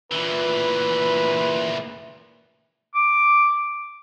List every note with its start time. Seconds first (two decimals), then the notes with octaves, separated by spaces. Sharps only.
0.12 A#2 E3 B4
2.95 D6